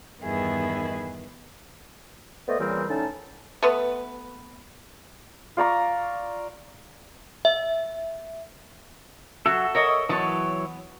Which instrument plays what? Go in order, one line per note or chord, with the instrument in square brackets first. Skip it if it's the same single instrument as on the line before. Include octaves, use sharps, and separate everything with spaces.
[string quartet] E2 G2 D#3 B3 E4 G#4
[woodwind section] A3 B3 C5 D5 D#5
A#2 C#3 E3 G3 A#3 C4
A2 D3 C#4 D#4 A5
[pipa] A3 B3 B4
[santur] F4 D5 A#5 C#6
[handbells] E5
[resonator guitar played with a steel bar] F#3 F#4 [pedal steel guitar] A4 E5
[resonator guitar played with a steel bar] A#4 C#5 D#5
[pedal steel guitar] E3 F#3 C#5 [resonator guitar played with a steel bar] B3 A5